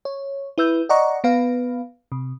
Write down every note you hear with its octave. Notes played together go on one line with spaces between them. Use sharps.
C#5
E4 B4 E6 G6
D5 D#5 F#5 A#5 C#6
B3 B4 F5
C3